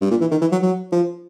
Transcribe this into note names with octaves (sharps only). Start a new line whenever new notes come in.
G2
A#2
E3
D#3
E3
F#3
F#3
F3